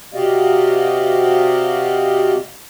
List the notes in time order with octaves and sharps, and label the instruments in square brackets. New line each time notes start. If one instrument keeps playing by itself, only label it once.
[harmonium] C3 F#4 G4 D5 D#5 F5